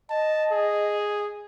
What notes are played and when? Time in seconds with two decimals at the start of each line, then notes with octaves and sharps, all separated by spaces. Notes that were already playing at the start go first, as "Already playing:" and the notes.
0.10 D#5 A5
0.52 G#4